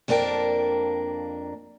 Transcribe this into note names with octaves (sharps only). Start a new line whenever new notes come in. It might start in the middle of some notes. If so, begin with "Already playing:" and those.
F2 A#3 D4 A#4 G5 A5